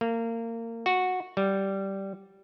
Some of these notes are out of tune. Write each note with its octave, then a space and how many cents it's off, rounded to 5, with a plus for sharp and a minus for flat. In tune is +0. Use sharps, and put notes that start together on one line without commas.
A#3 -25
F#4 -10
G3 -10